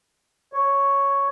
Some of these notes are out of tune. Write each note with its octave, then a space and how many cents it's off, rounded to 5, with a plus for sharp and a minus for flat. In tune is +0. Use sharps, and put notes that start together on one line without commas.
C#5 +0